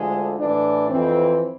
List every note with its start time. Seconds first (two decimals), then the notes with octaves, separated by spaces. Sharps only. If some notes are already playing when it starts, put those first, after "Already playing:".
Already playing: D2 D3 F3 G#3
0.39 A2 E3 D4
0.90 F2 E3 C4